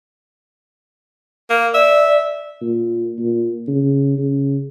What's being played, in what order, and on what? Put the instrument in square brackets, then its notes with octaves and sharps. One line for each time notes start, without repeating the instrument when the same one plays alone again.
[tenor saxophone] A#3
[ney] D5 [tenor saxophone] E5
[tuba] A#2
A#2
C#3
C#3